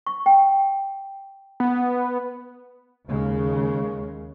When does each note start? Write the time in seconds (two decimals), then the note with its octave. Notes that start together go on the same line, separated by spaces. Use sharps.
0.07 C#6
0.26 G5
1.60 B3
3.09 D#2 C#3 G#3